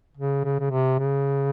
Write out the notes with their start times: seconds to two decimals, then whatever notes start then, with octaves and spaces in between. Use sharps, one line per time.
0.17 C#3
0.44 C#3
0.59 C#3
0.70 C3
0.99 C#3